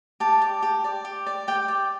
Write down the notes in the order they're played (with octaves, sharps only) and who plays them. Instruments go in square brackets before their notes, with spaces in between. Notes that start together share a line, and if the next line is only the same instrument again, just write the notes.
[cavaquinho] G4 A5
D5
G4
D5
G4
D5
G4 G5
D5